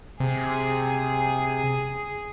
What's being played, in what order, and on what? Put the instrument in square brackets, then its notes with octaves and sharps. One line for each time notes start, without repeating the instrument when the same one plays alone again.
[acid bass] C3 [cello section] G#4